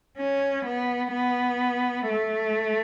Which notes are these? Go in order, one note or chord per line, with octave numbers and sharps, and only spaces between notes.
C#4
B3
B3
A3